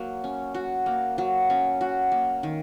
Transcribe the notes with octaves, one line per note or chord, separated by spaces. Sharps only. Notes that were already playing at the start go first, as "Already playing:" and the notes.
Already playing: F#3 A#3
C#4
F#4
A#3
F#3
C#4
F#4
A#3
D#3